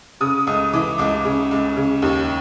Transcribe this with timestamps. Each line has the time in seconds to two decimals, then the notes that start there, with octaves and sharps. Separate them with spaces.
0.21 C#3 D#6
0.47 C#2 D#6
0.73 E3 D6
0.98 C#2 D6
1.25 C#3
1.51 C#2
1.76 C#3
2.02 D#2